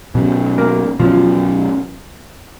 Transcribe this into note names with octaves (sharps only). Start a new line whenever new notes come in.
B2 F#3 C#4
A#3
B2 F3 F#3 C#4